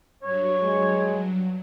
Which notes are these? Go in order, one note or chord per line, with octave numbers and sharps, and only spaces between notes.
G2 F#3 C#5
G#3